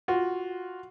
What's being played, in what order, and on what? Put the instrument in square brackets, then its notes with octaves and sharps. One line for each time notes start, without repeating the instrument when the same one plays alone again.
[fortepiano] F4 F#4